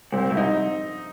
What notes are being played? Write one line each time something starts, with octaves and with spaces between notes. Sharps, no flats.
C2 C4
C2
D#4